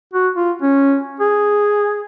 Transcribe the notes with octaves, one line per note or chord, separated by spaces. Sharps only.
F#4
F4
C#4
G#4